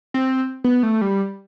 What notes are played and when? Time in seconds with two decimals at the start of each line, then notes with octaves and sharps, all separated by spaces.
0.14 C4
0.64 B3
0.83 A3
1.01 G3